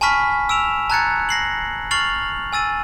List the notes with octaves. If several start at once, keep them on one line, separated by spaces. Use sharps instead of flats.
G#5 A5 B5 C#6 F6 B6
E6 D7 E7 F7
A5 A#5 F#6 G#6 A6 C#7
A#6 C7 F#7
C#6 F6 A6 C7 F7 F#7
G#5 E6 A6 D#7